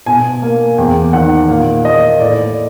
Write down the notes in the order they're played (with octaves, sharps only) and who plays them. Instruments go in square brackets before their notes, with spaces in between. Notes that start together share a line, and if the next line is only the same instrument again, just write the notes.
[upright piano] B2 G#5
A#3
E2 G5
D#3 F#5
A#2 F5
A#3 D#5
A2 D5